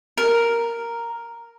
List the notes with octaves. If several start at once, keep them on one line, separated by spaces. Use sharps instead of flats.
A#4